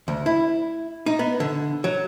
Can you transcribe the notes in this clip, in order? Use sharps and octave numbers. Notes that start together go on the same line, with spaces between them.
D2
E4
D#4
B3
D3
F#3